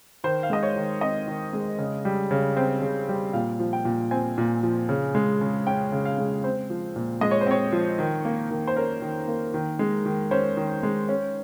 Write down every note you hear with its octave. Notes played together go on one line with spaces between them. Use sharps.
D#3 C5
F5
G#3 D#5
C#5
D#3
C4 D#5
D#3
G#3
C#3
G3
C#3
C4
C#3
G3
A#2 F5
F3
G5
A#2
C4 G#5
A#2
F3
C#3
G#3
C#3
C#4 G5
C#3
F5
G#3
C4 C5
F3
A#2
G#3 D#5
C#5
C5
C4 C#5
F3
D#3
A#3
D#3
C5
C#4 A#4
D#3
A#3
D#3
G#3
D#3
C#4 C5
D#3
G#3
C#4